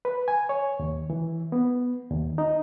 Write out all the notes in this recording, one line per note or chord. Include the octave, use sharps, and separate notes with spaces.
B4
G#5
C#5
D#2
E3
B3
D#2
D#4